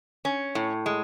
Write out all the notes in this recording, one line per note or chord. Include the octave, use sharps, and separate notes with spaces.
C#4
A2
G#3